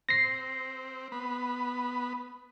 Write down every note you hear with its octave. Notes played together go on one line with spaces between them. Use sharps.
C4 A#6 C7
B3 B5